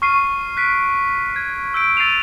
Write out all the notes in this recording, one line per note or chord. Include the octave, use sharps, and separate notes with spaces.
C#6 F6 C7 D#7
F#6 B6 D7
G#6
E6 G6 D7
E6 A6 C7 D#7 F7